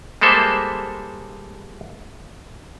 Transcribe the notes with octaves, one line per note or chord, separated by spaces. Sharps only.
G3 G#3 A#3 A4 C5 E5